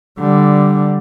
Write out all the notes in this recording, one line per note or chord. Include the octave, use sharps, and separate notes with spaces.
D3 G3